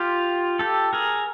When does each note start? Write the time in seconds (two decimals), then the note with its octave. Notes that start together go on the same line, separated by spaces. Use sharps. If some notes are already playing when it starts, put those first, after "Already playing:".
Already playing: F4 G4
0.59 G4 A4
0.93 G#4 A#4